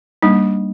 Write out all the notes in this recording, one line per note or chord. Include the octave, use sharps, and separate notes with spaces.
G3 A#3 D4 D#4